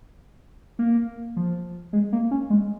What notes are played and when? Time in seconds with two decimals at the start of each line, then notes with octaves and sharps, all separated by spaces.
0.79 A#3
1.37 F3
1.93 G#3
2.12 A#3
2.31 C#4
2.50 G#3